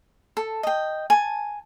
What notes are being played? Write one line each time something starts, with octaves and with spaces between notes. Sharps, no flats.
A4
D#5 G5
G#5 A5